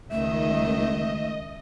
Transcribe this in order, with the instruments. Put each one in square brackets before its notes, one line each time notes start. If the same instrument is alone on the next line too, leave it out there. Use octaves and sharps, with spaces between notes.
[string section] C#2 D#3 [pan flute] A3 [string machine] D#5 [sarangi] E5